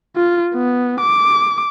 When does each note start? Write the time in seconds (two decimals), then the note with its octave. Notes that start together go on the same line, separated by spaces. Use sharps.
0.16 F4
0.54 B3
1.01 D6